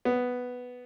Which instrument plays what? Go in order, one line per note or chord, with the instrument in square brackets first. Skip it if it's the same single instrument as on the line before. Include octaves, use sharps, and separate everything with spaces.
[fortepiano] B3